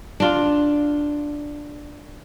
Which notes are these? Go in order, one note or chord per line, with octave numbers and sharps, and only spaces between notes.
D4 F4